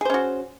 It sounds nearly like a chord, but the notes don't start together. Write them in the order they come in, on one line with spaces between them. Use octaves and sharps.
G#4 C5 C#4 F#4